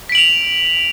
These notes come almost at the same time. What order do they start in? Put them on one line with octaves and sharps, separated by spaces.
B6 D7 F#7 F7